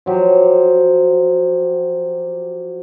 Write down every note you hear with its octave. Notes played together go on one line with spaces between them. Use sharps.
F3 F#3 G4